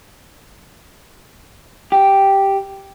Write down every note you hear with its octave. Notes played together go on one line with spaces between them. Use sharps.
G4